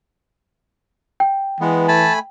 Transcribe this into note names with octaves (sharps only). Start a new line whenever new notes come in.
G5
E3 G#3 B3
A3 G#5 A5 B5